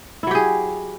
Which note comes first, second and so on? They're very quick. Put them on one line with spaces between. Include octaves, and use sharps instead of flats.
E4 F#3 G4 G#4